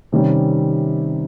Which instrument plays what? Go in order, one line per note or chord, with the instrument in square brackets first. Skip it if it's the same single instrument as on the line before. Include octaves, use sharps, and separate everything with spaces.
[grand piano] C3 D#3 G3 C#4